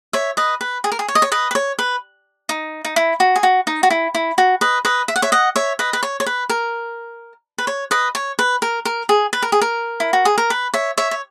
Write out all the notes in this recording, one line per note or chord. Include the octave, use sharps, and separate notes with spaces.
C#5 E5
B4 D#5
B4
G#4
A#4
G#4
C#5
D#5
C#5
B4 D#5
B4
C#5
B4
D#4
D#4
E4
F#4
G#4
F#4
D#4
F#4
E4
E4
F#4
B4 D#5
B4 D#5
E5
F#5
C#5 E5
D#5 F#5
C#5 E5
B4 D#5
B4
C#5
C#5
B4
A#4
B4
C#5
B4 D#5
C#5
B4
A#4
A#4
G#4
B4
A#4
G#4
A#4
E4
F#4
G#4
A#4
B4
C#5 E5
C#5 E5
C#5